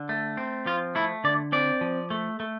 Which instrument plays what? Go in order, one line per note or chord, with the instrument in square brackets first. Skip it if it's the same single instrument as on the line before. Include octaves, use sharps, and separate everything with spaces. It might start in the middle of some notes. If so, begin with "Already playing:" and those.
Already playing: [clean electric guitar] D3
A3
C4
F3 F4
A3 E4
D3 D5
C4 D5
F3
A3
A3